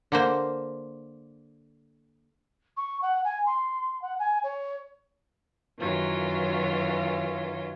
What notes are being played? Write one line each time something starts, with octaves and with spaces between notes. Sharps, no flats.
D3 A#3 C5
C#6
F#5
G#5
C6
F#5
G#5
C#5
F#2 D#3 E3 F#3 F4